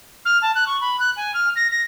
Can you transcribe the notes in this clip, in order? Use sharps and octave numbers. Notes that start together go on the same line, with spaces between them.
F6
A5
F#6
C#6
B5
F#6
G#5
F6
A#6
A#6